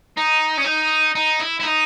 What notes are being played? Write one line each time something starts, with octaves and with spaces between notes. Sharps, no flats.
D#4
C#4
D#4
D#4
E4
E4
D#4